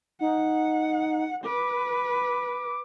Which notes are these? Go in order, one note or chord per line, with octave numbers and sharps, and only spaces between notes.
D#4 F#5
B4 D6